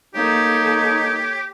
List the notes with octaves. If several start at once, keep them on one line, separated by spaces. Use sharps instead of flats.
A#3 D#4 G4 A4 C#5